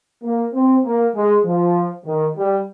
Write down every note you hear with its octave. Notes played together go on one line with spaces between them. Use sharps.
A#3
C4
A#3
G#3
F3
D#3
G3